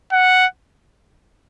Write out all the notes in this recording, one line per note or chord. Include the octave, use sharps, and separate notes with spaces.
F#5